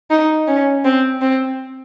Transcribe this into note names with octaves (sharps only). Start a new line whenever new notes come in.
D#4
C#4
C4
C4